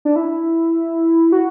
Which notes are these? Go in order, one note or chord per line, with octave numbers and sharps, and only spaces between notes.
D4
E4
F#4